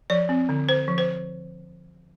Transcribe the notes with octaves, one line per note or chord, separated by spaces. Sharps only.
F3 D5
C4
D3
D3 C5
F3
C5